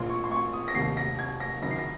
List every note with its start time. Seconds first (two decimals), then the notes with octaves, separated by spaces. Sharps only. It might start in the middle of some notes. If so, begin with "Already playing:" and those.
Already playing: A#1 A#2 C6
0.10 C#6
0.24 C6
0.31 C#6
0.53 D#6
0.68 A#6
0.75 F1 D#2 D#3 C7
0.97 A#6
1.19 G#6
1.40 A#6
1.62 F#1 F#2 D#3 A#6
1.71 C7
1.78 A#6